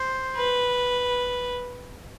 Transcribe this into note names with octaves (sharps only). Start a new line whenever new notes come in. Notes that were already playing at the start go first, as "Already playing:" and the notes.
Already playing: C5
B4